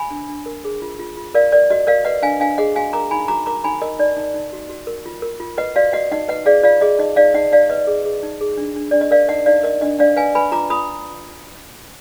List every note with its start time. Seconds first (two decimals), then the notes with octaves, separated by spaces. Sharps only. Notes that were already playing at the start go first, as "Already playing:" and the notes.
Already playing: G#5 B5
0.10 D4
0.29 D4
0.46 A#4
0.64 G#4
0.82 F4
0.99 F4
1.17 F4
1.34 A#4 D5 F5
1.52 A#4 D5
1.71 F#4 D#5
1.87 A#4 D5 F5
2.05 B4 D#5 F#5
2.22 D4 F5 G#5
2.40 D4 F5 G#5
2.58 G#4 D#5 F#5
2.75 F#4 F5 G#5
2.93 A#4 A#5 D6
3.11 D#4 G#5 B5
3.28 F#4 A#5 D6
3.46 A#4 A#5 D6
3.64 D#4 G#5 B5
3.82 A#4 D#5
3.99 D#4 D5
4.17 D#4
4.34 D#4
4.53 F#4
4.69 F#4
4.87 A#4
5.06 F4
5.22 A#4
5.40 F4
5.58 B4 D#5 F#5
5.76 F#4 D5 F5
5.93 F#4 D#5 F#5
6.12 D#4 D#5 F#5
6.28 B4 D#5 F#5
6.46 G#4 D5 F5
6.63 F4 D5 F5
6.81 G#4 D#5
6.99 D#4 D#5
7.16 D#4 D5 F5
7.34 D#4 D#5 F#5
7.52 D#4 D5 F5
7.70 B4 D#5
7.87 G#4
8.05 G#4
8.23 D#4
8.41 G#4
8.58 D4
8.76 D4
8.91 D4 D5
9.01 D#5
9.11 A#4 D5 F5
9.29 D#4 D#5 F#5
9.46 D#4 D5 F5
9.63 A#4 D#5
9.81 D4 D#5
9.99 D4 D5 F5
10.16 B4 F5 G#5
10.35 B4 G#5 B5
10.52 F4 A#5 D6
10.70 F4 B5 D#6